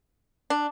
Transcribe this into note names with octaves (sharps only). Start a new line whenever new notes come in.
D4